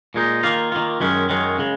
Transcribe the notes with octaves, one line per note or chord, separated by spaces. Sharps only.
A#2 G#3 D#4
D#3 A#3 F4
D#3 A#3 F4
F#2 D#3 G#3 C#4
F#2 D#3 G#3 C#4
C#3 G#3